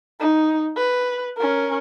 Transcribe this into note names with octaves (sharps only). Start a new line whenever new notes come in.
D#4
B4
C#4 A#4